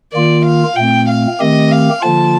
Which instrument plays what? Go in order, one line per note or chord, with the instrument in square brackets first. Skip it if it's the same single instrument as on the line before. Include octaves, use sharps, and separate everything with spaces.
[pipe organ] D#3 A#3 F4 [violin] D5
[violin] F5
[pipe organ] A#2 A3 C4 [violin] G5
[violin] F5
[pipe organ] D#3 A3 C4 G4 [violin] D#5
[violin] F5
[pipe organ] D3 F3 A#3 F4 [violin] A5